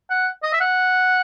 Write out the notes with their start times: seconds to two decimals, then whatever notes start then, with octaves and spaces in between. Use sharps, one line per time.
0.10 F#5
0.43 D#5
0.53 E5
0.61 F#5